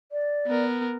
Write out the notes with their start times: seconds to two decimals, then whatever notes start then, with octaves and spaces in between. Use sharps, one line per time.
0.12 D5
0.47 B3 A#4